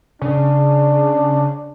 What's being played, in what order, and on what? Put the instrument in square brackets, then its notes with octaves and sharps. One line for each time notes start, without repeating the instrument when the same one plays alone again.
[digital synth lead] C#3 [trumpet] D4